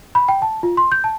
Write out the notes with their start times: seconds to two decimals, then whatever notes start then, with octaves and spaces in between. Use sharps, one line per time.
0.15 B5
0.28 G5
0.42 A5
0.63 F4
0.77 C6
0.92 G6
1.04 A5